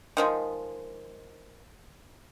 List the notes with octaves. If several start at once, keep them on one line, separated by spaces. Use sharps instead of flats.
D#3 F3 G#3